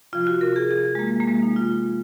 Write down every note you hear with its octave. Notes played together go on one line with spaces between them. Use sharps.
C3 F3 F4
F#4
C3 F3 A#4
G#4
C3 F3 G#4
G#3
C3 F3 A#3
A#3
C3 F3 G#3
D#4
C3 F3 F4
F3